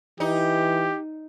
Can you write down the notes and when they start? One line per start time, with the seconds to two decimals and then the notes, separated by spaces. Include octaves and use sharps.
0.20 E3 D#4 G4